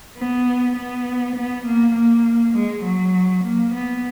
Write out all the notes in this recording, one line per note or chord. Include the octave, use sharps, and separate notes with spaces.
B3
B3
B3
A#3
A#3
G#3
F#3
A#3
B3